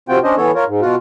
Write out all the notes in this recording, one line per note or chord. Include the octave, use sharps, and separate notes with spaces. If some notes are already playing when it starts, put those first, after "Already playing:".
C3 C4 F4 F#4 G5
C#4 D4 C5 D#5
E3 B3 A4 C#5
F4 A#4 C#5
G#2
B2 F4 F#4